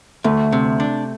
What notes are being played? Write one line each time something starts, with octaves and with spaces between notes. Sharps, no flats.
D2 A3
C3
D4